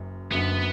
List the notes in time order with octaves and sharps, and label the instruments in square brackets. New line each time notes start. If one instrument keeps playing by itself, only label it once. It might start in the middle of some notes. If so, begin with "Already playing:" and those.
Already playing: [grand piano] F#1 F#2
[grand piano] F#1 F#2 D3 [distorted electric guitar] B3